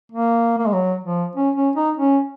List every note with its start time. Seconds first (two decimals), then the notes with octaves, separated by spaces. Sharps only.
0.12 A#3
0.58 A#3
0.66 G#3
0.73 F#3
1.04 F3
1.35 C#4
1.56 C#4
1.76 D#4
1.97 C#4